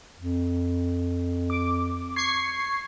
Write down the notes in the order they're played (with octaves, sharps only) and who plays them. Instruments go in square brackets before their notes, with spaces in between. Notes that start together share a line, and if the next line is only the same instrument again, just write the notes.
[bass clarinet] F2
[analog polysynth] D6
C#6 G#6 C7